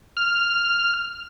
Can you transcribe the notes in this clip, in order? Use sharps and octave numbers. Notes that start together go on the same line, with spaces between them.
F6